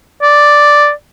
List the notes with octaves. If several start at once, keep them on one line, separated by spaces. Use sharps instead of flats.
D5